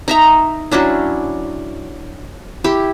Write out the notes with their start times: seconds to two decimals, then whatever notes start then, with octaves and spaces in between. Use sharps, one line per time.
0.08 D#4 E5 A#5
0.72 F#3 C#4 D4 E4
2.64 E4 G4